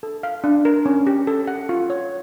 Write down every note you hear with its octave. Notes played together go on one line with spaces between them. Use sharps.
A4
F5
D4
A#4
C#4
G4
A4
F#5
F4
C#5